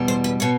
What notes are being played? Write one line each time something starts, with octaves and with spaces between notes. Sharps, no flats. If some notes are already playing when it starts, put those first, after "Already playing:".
Already playing: E2 B2 G3
C5
B4
B2 C#5